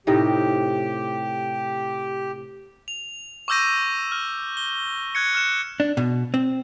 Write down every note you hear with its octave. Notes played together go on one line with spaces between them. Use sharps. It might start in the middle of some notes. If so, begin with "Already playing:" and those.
A2 C3 D#4 G4
F7
C#6 D6 E6 G6 A#6 D#7
F6
G7
F#6 G#6 C#7
F6 F#6 E7
D4
B2
C4